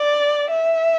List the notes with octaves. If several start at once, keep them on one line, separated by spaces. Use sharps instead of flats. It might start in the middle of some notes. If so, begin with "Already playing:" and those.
Already playing: D5
E5